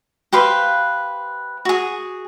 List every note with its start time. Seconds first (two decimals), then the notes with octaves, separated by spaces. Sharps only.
0.33 G4 B4 C5 F5
1.65 F#4 G#4